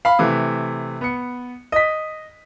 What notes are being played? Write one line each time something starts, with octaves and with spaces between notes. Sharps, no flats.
F5 B5
C3 E3 A3
B3 C#7
D#5 B6